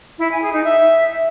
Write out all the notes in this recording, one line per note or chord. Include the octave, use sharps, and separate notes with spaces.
E4
G#5
G#4
D#4
E5